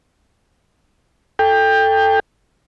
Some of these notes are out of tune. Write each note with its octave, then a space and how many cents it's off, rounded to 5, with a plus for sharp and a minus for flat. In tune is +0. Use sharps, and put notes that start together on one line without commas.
A4 +0 G5 +20